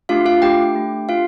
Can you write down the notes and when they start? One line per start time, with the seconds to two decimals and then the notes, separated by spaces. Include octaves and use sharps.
0.09 A3 D4 F4 G4 F5
0.26 F4 F5
0.42 A3 D4 G4 G5
0.75 A3 D4 G4
1.09 D4 F4 F5